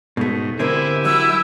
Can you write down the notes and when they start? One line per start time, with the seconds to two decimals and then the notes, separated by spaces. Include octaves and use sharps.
0.17 G#2 B2 A3
0.59 D3 C4 E4 G4 A#4 G#5
1.05 F#3 E4 E6